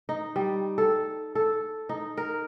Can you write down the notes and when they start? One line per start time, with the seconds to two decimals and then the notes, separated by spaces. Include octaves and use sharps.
0.09 D#4
0.36 G3
0.78 A4
1.35 A4
1.89 D#4
2.17 A#4